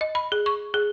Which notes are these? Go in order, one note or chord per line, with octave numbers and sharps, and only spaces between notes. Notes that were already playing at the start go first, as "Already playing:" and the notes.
D#5
B5
G#4
C#6
G#4